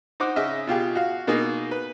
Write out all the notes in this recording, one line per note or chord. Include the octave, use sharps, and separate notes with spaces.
D#4 C5 F#5 D6
C#3 D#5 E5 F6
B2 F4 G4 G#4
F#4 F5
B2 A#3 D#4 G#4
B4